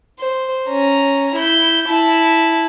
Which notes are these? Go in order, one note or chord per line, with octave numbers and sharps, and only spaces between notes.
C5
C#4 A#5
E4 G6
E4 A5